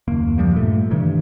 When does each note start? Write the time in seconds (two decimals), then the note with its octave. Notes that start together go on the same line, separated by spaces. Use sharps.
0.08 F#1 D#2 A#3
0.38 D#2 F3 G3 A#3
0.53 G2 A#2 A3
0.91 G2 C3 D#3 E3